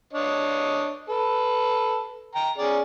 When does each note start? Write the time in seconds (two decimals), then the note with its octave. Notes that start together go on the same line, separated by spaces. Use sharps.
0.13 D4 C#5 D#5
1.09 A4 B4
2.35 G5 A#5
2.58 C#4 G#4 D5